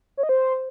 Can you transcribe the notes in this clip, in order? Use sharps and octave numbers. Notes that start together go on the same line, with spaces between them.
C#5
D#5
C5